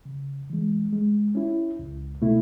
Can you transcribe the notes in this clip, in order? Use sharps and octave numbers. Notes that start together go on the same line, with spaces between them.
C#3
E3 G#3
G#3
C#4 E4
C#2
B2 A3 E4